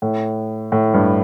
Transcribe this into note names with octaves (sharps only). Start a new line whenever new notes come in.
A2
A2
G2